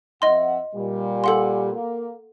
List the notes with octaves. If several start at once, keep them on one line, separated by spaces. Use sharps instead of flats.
F2 D#5 E5 F#5 C6
A#2 G3
A4 F#5 C6
A#3